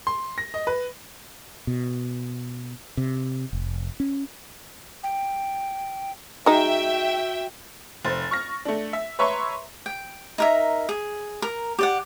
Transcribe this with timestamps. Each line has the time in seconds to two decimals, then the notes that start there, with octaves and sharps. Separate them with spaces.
0.07 C6
0.38 A#6
0.54 D#5
0.67 B4
1.67 B2
2.97 C3
3.53 F1
4.00 C#4
5.03 G5
6.46 G#3 D#4 F#4 E5 G5
8.05 F1 C5 A6
8.31 C#6 F6 A#6
8.65 A3 D4
8.93 E5
9.19 B4 C#5 E5 A#5 C6 C#6
9.86 G5
10.38 D#4 A#4 E5
10.89 G#4
11.42 A#4
11.79 G4 D5 F#5